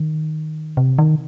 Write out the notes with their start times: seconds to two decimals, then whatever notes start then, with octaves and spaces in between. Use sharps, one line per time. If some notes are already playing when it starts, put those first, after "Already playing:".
Already playing: D#3
0.77 C3
0.99 D#3